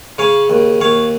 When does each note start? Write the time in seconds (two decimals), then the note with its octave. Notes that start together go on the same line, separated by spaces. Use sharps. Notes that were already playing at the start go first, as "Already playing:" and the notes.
0.18 C#3 C#5 F5
0.50 D#2
0.81 D#2 C#5 F5